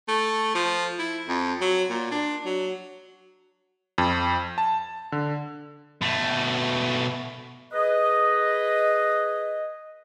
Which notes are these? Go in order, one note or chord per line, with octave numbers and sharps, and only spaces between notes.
A3
F3
E4
F2
F#3
A#2
D4
F#3
F2
A5
D3
B2 A3
G#4 B4 D#5